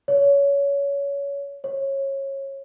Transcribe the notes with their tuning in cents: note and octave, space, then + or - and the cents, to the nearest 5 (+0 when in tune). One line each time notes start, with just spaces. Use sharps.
C#5 +20
C#5 -20